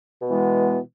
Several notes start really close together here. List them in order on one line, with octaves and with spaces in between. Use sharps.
B2 B3 G#3 E3